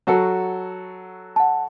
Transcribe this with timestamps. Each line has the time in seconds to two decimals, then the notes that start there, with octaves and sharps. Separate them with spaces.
0.07 F#3 F#4 A4
1.36 F#5 A5